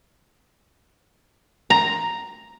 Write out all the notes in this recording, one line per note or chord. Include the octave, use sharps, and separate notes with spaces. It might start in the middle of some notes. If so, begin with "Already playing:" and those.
A#5